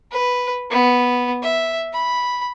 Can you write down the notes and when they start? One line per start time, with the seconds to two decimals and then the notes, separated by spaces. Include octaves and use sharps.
0.11 B4
0.70 B3
1.43 E5
1.93 B5